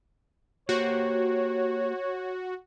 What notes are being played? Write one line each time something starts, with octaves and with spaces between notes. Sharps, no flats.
A#3 F#4 G4 C5 C#5